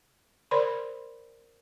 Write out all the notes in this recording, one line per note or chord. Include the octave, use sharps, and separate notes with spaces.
A#4 C5 D5 B5 C6